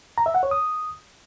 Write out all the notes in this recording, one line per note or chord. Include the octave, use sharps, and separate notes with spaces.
A#5
E5
F#5
C#5
D#6